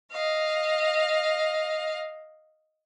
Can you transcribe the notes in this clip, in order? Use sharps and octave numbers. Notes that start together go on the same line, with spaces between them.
D#5 F5